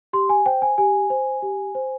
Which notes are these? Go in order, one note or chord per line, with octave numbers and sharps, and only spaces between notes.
G4 C6
G#5
C5 G5
G#5
G4 G#5
C5
G4
C5